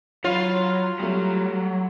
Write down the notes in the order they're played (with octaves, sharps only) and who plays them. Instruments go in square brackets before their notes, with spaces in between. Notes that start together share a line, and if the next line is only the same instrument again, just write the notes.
[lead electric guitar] F#3 [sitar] F4 [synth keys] C#5 B5 C6
[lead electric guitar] F#3 [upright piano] G3 A3